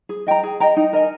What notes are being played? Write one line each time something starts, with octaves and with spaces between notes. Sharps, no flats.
G#4
D#5 G5 A#5
G#4
D#5 G5 A#5
D#4
A#4 D#5 G#5